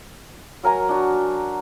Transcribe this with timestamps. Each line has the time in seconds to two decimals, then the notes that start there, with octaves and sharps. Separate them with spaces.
0.63 F#3 A#4 G#5 A#5
0.89 D4 F#4